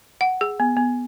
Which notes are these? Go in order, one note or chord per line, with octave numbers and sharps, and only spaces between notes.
F#5
G#4
B3
B3